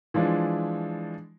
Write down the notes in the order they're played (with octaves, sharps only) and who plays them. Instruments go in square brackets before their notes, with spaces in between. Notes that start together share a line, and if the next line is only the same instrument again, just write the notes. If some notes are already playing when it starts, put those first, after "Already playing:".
[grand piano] E3 F3 G#3 D4